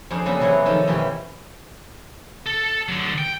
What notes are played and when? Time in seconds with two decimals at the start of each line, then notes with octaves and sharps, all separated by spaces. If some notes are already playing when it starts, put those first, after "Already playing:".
0.10 F2 D4 G#4 C5
0.26 C#3 F#3 G3 A#3 G#4 A4
0.40 C3 E3 F#3 E4 G#4 C#5
0.66 D#3 F3 D#4 A4 A#4
0.87 F#2 B2 E3 F4 G4
2.46 A4
2.88 D3 F#3
3.18 G5